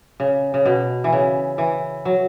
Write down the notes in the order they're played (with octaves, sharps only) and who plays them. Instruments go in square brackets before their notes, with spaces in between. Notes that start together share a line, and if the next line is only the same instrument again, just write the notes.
[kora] C#3
C#3
B2
E3
C#3
E3
F#3